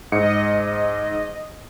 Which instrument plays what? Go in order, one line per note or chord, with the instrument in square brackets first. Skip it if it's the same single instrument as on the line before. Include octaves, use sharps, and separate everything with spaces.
[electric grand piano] G#2 C#7 [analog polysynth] D#5